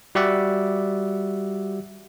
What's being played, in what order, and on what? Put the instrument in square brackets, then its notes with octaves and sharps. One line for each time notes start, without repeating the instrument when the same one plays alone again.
[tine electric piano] G3 F#4 G4 D5 E5 F#5